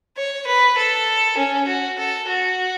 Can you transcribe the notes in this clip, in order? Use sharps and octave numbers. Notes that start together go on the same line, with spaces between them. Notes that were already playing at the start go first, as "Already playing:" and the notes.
C#5
B4
A4
C#4
F#4
A4
F#4